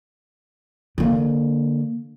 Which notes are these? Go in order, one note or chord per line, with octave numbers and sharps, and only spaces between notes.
D3 A#3